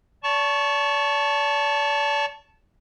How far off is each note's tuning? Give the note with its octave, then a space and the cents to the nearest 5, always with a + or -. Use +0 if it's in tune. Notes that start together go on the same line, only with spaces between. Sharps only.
D5 -40 A5 +0 C#6 +0